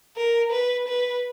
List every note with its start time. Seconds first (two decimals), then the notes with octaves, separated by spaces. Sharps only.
0.17 A#4
0.52 B4
0.88 B4